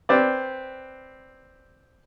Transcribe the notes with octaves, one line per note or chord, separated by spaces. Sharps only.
C4 B4 D5